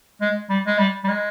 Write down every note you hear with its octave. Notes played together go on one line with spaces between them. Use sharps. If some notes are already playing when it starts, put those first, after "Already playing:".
G#3
G3
G#3
G3
G3
G#3